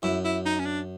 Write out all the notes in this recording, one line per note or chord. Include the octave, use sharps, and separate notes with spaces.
F#2 E4
E4
D#4
C#4
D4